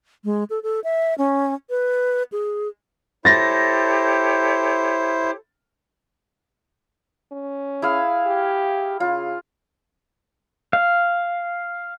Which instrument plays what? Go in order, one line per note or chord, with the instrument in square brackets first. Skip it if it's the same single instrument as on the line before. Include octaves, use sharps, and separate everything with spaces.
[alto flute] G#3
A4
A4
E5
C#4
B4
G#4
[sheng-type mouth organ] E4 C5 [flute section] G4 A4 C#5 [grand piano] A6 A#6
[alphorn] C#4
[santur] E4 G#4 F5
[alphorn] G4
[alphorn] C#3 [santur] F4
[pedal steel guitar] F5